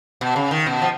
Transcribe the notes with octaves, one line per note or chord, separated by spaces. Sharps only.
B2
C#3
D#3
B2
F3